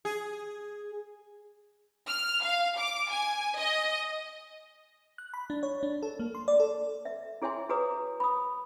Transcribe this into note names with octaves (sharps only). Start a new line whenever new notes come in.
G#4
F6
F5
D6
G#5
D#5
F#6
B5
D4
C#5
D4
A4
A#3
C6
D5
A4
E5
E4 G#4 C#5 E5 G#5 C6
F#4 G#4 B4 C#5 A#5 D#6
B5 D#6